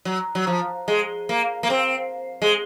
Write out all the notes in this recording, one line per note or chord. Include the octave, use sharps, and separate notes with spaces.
F#3
F#3
F3
G#3
A#3
A#3
C4
G#3